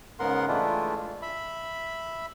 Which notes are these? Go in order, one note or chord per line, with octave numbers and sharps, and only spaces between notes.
G#2 C#3 B3 A#4 F#5 C6
E3 G#3 A3 D4 E4 F4
E5 B5